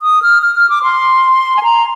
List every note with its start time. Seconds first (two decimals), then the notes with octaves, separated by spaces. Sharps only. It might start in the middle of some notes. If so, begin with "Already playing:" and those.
0.02 D#6
0.22 F6
0.42 F6
0.55 F6
0.70 D6
0.83 C6
1.57 G#5
1.63 A#5